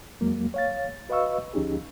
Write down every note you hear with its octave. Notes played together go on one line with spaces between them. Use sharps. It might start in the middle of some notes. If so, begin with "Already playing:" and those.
F2 F#3 G#3 A#3
C#5 F5 A6
F#4 B4 D#5 F5 C#6 E6
D2 F3 C#4 D#4 G4 G#4